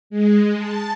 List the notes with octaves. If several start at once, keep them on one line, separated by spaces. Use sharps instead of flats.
G#3
A5